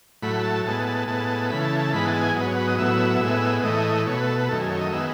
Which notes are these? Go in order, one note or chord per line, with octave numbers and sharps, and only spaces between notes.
A2 F#3 A3 B5
A5
A2 G#3 B3 A5
A5
A2 G#3 B3 A5
C#3 E3 A3 B5
A5
A5
G#2 E3 G#3 B3 B5
A5
G#5
G#2 F#3 B3 D#5
B4
C#5
B4
D#5
A2 F#3 B3 E5
A2 G#3 B3
A2 E3 A3 D#5
B2 A3 C#5
B4
A4
B4
F#2 D#3 A3 A4
G#4
C#5
D#5
D#3 G#3 B3 E5